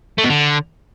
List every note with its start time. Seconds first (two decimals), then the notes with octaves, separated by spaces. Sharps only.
0.18 A3
0.24 B2
0.29 D3